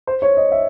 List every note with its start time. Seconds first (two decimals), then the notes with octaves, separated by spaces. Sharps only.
0.07 C5
0.22 C#5
0.37 D#5
0.52 E5